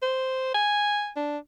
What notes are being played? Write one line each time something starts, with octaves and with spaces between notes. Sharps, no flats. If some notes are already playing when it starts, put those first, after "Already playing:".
C5
G#5
D4